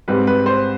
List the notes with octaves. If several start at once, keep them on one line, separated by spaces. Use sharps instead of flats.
G#2 G3 C4 B4
B4
C5